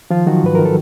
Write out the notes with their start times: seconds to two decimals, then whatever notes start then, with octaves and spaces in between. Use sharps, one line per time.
0.11 D#3 F3 F4
0.27 D#3 F#3 F#4
0.43 G#2 B4
0.55 D#3 A#4
0.65 A4